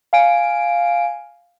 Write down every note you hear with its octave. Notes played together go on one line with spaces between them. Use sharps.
F5 G#5 D7